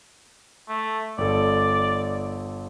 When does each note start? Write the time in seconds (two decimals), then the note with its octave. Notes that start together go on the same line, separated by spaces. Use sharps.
0.69 A3
1.18 G1 A4 D5